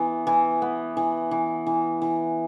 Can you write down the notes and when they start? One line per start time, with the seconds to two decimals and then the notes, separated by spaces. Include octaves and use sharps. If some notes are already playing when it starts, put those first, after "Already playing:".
Already playing: E3 B3
0.27 E3
0.62 B3
0.97 E3
1.31 E3
1.66 E3
2.02 E3